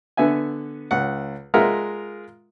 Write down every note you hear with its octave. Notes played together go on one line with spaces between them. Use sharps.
D3 B3 E5 G#5
C#2 F#5
G#3 F4 A#4 E5 F#5 A#5